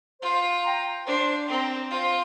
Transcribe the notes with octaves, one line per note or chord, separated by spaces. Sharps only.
F4 C5
G5 A#5
D4 C5
C4 G5 A#5
F4 C5